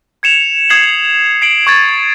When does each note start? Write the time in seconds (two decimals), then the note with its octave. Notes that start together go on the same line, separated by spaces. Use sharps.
0.23 G#6 C#7 E7 F7
0.70 D#6 G#6 C7 F#7
1.42 C7 D7 F#7
1.67 C#6 G#6 A6